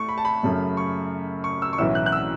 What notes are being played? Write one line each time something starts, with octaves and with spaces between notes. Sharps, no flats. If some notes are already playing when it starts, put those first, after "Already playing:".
Already playing: A2 A3 C#6
B5
A5
B5
F#2 C#3 A3
C#6
C#6
E6
C#6
B1 A2 E3 C#4 E4 E6
F#6
F#6
E6